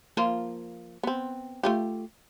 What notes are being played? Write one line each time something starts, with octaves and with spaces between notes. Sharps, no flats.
F3 A#3 F4
B3 C4
A3 F4 G4